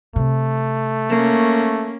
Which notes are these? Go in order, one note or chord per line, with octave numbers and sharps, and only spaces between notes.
C3 A3
A#3 C#4